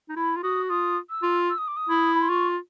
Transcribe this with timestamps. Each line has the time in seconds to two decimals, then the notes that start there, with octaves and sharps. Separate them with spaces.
0.09 D#4
0.16 E4 B5
0.36 F4
0.43 F#4 D#6
0.69 F4 D#6
1.10 E6
1.22 F4
1.50 E6
1.58 D#6
1.68 D6
1.77 D#6
1.89 E4
2.15 B5
2.22 C6
2.28 F4 C#6